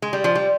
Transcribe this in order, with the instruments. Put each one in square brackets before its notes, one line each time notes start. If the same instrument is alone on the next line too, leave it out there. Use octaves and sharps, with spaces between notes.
[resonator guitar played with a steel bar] G#3
G3
F3
G3